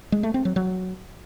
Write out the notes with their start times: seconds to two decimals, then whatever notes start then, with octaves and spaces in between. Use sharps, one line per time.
0.12 G#3
0.23 A3
0.34 C4
0.45 F#3
0.56 F#3